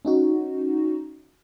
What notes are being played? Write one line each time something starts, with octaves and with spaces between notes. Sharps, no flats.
C#4 D#4 F#4